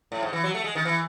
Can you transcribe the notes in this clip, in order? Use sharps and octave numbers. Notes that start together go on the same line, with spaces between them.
A2
G#2
E3
F#3
A3
G#3
D#3
E3